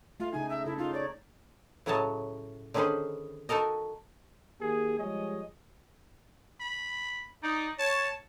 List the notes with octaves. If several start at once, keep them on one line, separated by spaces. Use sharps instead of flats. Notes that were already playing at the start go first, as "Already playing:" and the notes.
A3 F4
C#3 D#4 G#5
E5
C#3 E4 A4
D#4 F4
C#5 D5
A2 C#3 F#3 C#5 D#5 A5
D3 D#3 C#4 G#4 B4 C5
D#4 F#4 A4 A#4 D#5
D#3 A#3 G4 G#4
F3 G3 G#3 G#4 C#5 D#5
B5
D#4 D5
C#5 A5